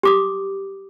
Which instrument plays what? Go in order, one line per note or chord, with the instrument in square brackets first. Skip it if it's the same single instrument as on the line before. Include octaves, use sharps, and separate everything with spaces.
[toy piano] G4 D6 D#6